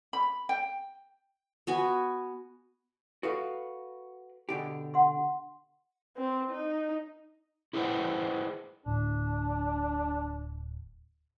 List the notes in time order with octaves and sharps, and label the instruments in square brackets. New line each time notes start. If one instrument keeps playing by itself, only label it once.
[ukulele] B5
G5
[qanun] B3 F#4 G#5
[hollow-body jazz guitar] F#4 B4 F5 [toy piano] A4
[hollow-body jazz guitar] B2 D3 G4 [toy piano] G#5
[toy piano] F#5 C6
[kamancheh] C4
D#4
[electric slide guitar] E4 G#4 B4 C5 F#5 G5
[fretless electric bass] D1 A2 D3 [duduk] D4